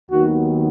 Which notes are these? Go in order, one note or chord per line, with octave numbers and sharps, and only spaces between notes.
D#2 D#3 F#3 B3 F#4